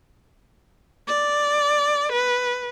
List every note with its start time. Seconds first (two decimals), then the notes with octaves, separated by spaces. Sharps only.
1.08 D5
2.12 B4